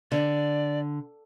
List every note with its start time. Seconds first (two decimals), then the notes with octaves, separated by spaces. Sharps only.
0.12 D3 D5